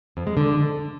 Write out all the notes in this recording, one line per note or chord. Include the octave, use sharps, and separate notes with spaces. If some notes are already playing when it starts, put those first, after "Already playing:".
F2
G#3
D3